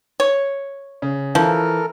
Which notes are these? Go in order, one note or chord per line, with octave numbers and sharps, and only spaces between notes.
C#5
C#3
E3 F3 A4 A#4 F6